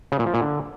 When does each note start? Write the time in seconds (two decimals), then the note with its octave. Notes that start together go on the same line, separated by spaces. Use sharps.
0.12 C#3
0.19 A#2
0.27 F3
0.34 A#2
0.41 D3